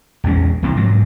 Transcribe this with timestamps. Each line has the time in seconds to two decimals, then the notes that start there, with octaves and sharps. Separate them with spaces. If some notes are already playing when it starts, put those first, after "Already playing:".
0.24 A#1 E2 G#3 C#4
0.62 C2 C3 E3 A#3
0.77 G#2 F3 F#3